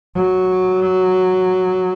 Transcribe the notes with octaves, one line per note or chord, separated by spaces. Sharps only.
F#3